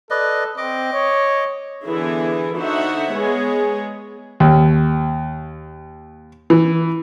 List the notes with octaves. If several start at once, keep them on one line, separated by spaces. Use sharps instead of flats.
A4 B4 D5 D#5
C4 D#5 D6
C#5
D3 E3 B3 E4 G#4
D3 D#4 F#4 C5 E5 F#5
G#3 B3 G#4 C#5
D#2
E3